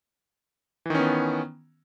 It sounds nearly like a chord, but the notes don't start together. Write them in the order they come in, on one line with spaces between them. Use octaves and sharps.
E3 D#3 C#4 B3